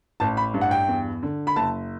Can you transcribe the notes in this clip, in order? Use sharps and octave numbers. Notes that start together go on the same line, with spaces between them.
A1 A5
B5
G2
F#5
G5
E2
D3
B5
F#1 A5